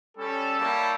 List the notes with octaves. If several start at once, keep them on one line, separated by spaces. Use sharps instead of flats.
G3 C#4 A4
G3 A#3 E4 G4 C#5 A5